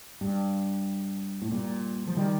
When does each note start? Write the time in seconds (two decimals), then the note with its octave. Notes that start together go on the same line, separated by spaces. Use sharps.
0.21 G2
1.42 A2
1.52 G2 A#2
2.07 F3
2.17 D#3 G3